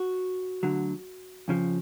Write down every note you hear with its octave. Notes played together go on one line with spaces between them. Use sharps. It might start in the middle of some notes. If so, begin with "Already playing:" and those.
Already playing: F#4
D2 D3 F#3
F2 C#3 F3